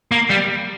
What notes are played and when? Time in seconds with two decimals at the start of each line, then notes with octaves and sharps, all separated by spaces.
0.12 A#3
0.30 G3